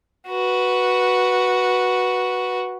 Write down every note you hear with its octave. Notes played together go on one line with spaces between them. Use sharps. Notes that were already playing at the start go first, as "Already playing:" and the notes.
F#4 B4